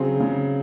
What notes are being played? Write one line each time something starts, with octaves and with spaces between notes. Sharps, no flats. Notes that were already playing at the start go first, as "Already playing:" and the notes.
Already playing: C#3 F#3 C4 G#4 C5
C#3